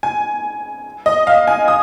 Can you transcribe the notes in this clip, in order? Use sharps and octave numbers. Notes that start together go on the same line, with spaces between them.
G#5
D#5
F5
G#5
D#6